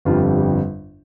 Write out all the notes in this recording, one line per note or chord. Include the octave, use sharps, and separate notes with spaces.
G1 F2 D3 G3 F4
G4